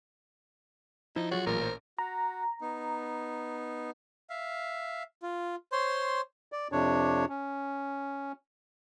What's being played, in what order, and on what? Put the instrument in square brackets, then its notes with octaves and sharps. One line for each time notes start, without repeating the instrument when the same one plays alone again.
[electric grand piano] F3 [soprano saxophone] D#4 [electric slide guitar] E4
[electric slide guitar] F#3 F4 G#4 [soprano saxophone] F#4 [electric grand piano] C#5
[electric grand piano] A1 A#2 [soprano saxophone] A#4
[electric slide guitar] C5
[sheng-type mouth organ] F#4 [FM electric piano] A#5
[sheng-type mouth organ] B3 D#4
E5 F5
F4
C5 C#5 C6
[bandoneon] D5
F2 C3 D4 C#5
C#4